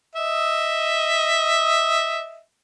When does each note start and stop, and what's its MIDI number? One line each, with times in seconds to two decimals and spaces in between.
0.16 2.41 75
0.16 2.41 76